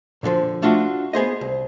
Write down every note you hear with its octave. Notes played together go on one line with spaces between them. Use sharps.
A#2 D3 D#3 F3
A3 D4 F4 F#4
B3 G#4 C5 D#5
C2